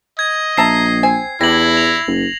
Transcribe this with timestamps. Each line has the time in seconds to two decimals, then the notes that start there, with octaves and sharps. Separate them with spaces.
0.19 D#5 G#6
0.57 A#1 E5 A5 A#5 C7
1.03 C4 C5 G#5
1.41 E2 G3 D4 E4 A#6 F#7
1.77 F7
2.07 F#1